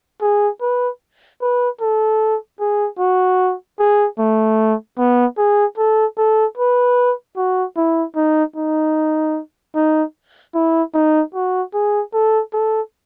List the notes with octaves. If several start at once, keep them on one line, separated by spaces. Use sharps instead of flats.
G#4
B4
B4
A4
G#4
F#4
G#4
A3
B3
G#4
A4
A4
B4
F#4
E4
D#4
D#4
D#4
E4
D#4
F#4
G#4
A4
A4